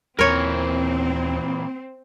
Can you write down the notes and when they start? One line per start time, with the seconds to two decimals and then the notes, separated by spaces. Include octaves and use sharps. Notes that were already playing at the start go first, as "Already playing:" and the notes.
0.19 D#2 A#2 E3 C4 A#4 C#5